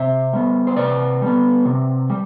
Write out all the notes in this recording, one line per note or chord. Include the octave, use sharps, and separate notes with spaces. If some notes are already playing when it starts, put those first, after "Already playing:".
Already playing: C3 C5 E5
G3 B3
C5
C3 B4 D5
G3 B3
C3
G3